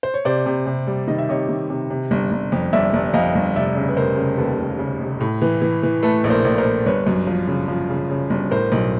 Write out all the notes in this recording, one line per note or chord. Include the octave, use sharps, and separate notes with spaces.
C5
C#5
C3 C5 D5
C3
C3
G3
D#3 D#5
E5
C3 C#5 D#5
D#3
C3
C3
G1
G1
F2
G1 D5 E5
G1
F2 D#5 F5
G1
F1 D5 E5
C#3
B4
F1 A#4 C5
C#3
D#2 A4 B4
F1
C#3
F1
A2
E3
E3
E3
A3 A4 B4
A#1
A#4 C5
A#1
A#4 C5
A#1
G1 B4 C#5
F#2
F3
C#3
F3
C#3
C#3
G1
A2 A#4 C5
B1